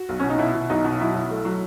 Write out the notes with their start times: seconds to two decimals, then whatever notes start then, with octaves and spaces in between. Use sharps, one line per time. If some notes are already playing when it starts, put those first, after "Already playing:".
Already playing: F#4
0.09 B1
0.20 B2 C#4
0.30 D#4
0.39 B2 E4
0.54 B2
0.70 B1 D#4
0.84 B2
1.00 F#3 E4
1.15 B1
1.30 A3
1.45 F#3